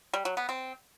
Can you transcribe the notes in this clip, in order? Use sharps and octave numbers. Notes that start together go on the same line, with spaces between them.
G3
F#3
B3
C4